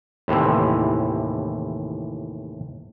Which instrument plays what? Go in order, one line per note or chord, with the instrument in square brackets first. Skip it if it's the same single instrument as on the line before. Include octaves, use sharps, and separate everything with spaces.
[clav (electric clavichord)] D#2 A2 C3 E3